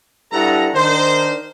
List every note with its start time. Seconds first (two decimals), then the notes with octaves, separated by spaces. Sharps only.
0.32 G2 E4 A4 F#5 A#5
0.74 D#3 D4 A#4 C5